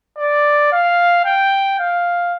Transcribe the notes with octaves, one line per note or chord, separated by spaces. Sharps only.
D5
F5
G5
F5